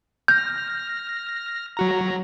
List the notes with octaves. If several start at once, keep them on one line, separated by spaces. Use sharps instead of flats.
F6 G6 A#6
F#3 F#4 A#5